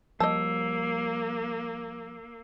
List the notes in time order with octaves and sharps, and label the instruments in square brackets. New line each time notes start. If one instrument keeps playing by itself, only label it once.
[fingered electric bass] F3 G3 [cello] A#3 [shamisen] D#5 A5 [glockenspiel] E6